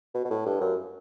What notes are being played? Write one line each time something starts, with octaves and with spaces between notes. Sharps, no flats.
B2
B2
A2
G2
F#2